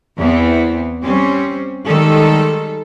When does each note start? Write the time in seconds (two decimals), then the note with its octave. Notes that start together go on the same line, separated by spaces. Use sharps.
0.17 E2 E3 B3 C4
1.03 G3 C4 C#4
1.86 D#3 G3 G#3 A4